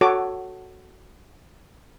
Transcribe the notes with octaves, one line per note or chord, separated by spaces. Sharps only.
F#4 A4 C#5 D6